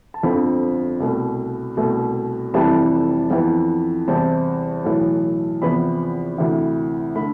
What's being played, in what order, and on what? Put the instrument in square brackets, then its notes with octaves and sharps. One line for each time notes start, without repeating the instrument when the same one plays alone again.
[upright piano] A5
G1 F2 D3 F3 C4 B5
C2 B2 A3
C2 B2 A3
F1 F2 C3 E3 G3 A5
F2 E3 B3
E2 C3 G3 C4 A5
B1 A2 E3
E2 C3 F3 B3 B5
D2 C3 E3
D3 A3 B5